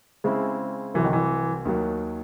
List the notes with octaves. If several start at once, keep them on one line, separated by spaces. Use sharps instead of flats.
C#3 G#3 C4 E4
C2 C3 E3 F#3
D#3
E3
D#2 D#3 F#3